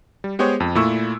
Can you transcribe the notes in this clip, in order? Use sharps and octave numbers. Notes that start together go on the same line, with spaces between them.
G3
G#3 B3 G4 G#4 C5 C#5
F2
A#2 A3 E4 C#6 E6